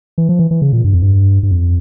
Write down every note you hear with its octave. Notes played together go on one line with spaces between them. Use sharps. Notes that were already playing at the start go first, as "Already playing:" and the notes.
E3
F3
E3
E3
C#3
A#2
G2
F2
G2
G2
F2